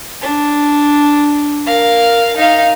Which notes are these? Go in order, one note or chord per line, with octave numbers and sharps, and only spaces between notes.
D4
A#4 F5
D#4 F5